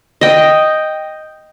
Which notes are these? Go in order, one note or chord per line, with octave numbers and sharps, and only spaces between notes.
D#5 G5